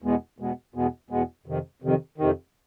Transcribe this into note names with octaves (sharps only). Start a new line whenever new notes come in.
E2 B2 G#3 B3
E2 B2 G#3 B3
E2 B2 G#3 B3
E2 B2 G#3 B3
F2 C3 D#3
F2 C3 D#3
F2 C3 D#3